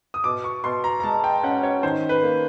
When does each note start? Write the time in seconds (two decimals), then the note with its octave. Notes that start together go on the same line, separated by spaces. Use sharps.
0.14 D#6
0.24 B2 D6
0.44 C#6
0.64 B2 C6
0.84 A#5
1.00 A#5
1.03 G#3 A5
1.24 G5
1.43 C#4 F#5
1.63 C#5
1.83 D#3 C5
2.09 B4
2.23 A#3